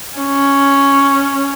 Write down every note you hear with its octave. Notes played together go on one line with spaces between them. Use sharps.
C#4